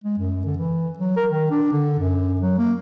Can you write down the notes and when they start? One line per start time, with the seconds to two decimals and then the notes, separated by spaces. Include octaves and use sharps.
0.04 G#3
0.18 F#2
0.46 D3
0.57 E3
0.98 F#3
1.17 A#4
1.30 D#3
1.51 D4
1.73 D3
1.99 F#2
2.41 F#3
2.58 A#3